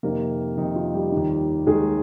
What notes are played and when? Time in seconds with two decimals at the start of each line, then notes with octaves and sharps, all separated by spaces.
0.03 F2 C3 D#3 A#3 A#4
0.57 F2 C3 D#3 D#4
0.76 F4
0.93 G3 G4
1.12 D#2 D#3
1.66 D#2 D#3 G#3 G#4